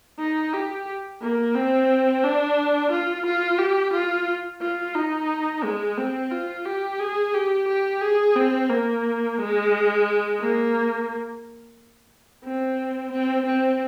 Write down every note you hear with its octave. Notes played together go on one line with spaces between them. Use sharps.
D#4
G4
A#3
C4
D4
F4
F4
G4
F4
F4
D#4
G#3
C4
F4
G4
G#4
G4
G4
G#4
C4
A#3
G#3
A#3
C4
C4
C4